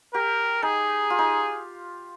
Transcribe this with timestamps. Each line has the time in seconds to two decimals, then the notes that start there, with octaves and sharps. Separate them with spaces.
0.14 G4 A#4
0.62 D#4 G#4
1.10 F4
1.18 D#4